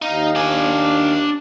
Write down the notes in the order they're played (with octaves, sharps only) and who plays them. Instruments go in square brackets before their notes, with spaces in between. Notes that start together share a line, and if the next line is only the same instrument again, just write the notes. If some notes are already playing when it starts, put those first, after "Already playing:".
[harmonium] D#2 F5 [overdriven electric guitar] D#4
[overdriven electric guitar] D4 G#5